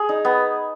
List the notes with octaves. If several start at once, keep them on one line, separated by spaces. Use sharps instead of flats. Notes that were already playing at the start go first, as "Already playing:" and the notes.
Already playing: G#4
D#4
B3